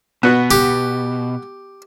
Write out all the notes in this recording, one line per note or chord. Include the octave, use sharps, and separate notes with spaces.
B2 B3 F#4
G4